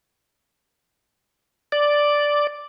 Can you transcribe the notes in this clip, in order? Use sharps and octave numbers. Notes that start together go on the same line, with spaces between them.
D5